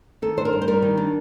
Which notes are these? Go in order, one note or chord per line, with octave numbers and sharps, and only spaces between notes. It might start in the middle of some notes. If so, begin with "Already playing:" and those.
D#3 A4
D4 C5
A#4
G2
C5
G3 A#4
D#3
D4